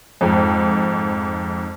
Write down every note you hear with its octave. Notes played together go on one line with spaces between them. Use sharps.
F2 G#2